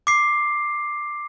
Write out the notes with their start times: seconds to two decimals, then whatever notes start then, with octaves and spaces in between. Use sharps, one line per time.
0.07 D6 C7